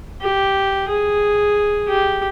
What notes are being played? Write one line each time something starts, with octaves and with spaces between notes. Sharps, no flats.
G4
G#4
G4